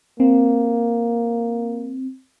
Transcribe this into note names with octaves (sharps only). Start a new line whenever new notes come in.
A#3 C4